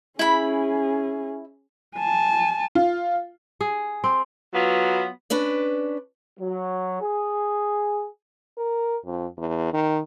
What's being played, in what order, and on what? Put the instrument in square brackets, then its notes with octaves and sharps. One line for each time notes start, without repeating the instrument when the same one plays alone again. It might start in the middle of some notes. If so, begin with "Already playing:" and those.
[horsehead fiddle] C#4 G#4 [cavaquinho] E4 B5
[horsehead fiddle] G#5 A5
[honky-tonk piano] F4
[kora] G#4
C4
[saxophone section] F#3 B3 F4 B4
[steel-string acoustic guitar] C#4 D4 B4 D5
[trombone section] F#3
G#4
[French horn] A#4
F2
E2
D#3